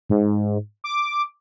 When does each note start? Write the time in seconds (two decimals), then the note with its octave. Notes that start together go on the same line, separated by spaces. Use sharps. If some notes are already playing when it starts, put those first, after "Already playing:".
0.10 G#2
0.84 D6